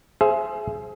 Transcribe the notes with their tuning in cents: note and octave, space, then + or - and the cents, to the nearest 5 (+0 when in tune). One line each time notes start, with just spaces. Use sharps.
G#4 +25 C5 +0 E5 +25